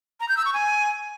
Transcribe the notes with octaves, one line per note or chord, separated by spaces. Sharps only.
A#5
G6
E6
C#6
G#5